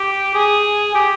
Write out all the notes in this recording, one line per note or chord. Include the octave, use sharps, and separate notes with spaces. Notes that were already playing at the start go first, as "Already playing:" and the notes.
Already playing: G4
G#4
G4